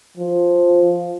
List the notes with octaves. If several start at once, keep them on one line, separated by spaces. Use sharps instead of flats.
F3